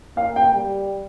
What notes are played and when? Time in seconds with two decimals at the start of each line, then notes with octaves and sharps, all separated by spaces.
0.17 A#3 F5
0.36 G5
0.55 G3